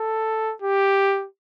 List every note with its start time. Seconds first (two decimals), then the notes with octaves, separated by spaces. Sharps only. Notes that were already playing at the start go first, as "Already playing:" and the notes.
Already playing: A4
0.62 G4